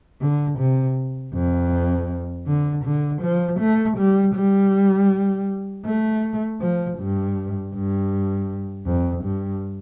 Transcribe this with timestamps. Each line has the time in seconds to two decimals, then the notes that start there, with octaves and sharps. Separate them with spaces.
0.21 D3
0.59 C3
1.34 F2
2.47 D3
2.85 D3
3.22 F3
3.60 A3
3.98 G3
4.35 G3
5.86 A3
6.61 F3
6.99 G2
7.74 G2
8.87 F2
9.25 G2